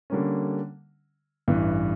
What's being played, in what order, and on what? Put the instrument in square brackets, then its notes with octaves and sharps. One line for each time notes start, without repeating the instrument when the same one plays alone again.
[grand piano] D3 G3 A#3 C#4
A1 G2 E3